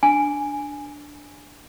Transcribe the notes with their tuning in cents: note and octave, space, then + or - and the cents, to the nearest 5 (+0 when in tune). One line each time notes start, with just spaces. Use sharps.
D4 +0 G#5 +0